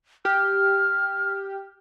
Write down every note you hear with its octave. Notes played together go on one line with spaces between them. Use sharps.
G4 F6